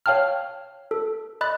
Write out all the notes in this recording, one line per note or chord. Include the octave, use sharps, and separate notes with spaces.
C#5 F5 G5 A5 F6
A4
D#5 B5 F#6 A6